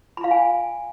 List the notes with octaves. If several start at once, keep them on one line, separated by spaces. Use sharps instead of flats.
B5
F5
G#5